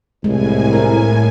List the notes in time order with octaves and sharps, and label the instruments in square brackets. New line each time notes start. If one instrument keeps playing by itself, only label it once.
[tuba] C2 [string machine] A2 G#5 [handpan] G#3
[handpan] E4 A#4